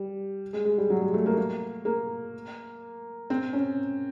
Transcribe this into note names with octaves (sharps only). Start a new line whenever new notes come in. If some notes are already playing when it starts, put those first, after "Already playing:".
Already playing: G3
G#3
G#3
G3
F#3
G#3
A3
A#3
A#3
A#3
C4
C#4